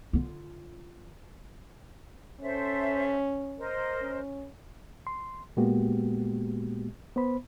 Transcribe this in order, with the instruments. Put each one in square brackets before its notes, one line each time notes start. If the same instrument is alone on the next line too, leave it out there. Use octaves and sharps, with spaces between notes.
[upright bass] D3 F4
[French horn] C#4 [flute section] A4 C5 E5
[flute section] A#4 C5 D#5
[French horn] C#4
[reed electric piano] C6
A#2 G#3 A#3 B3 F#4 G4
B3 C5 B5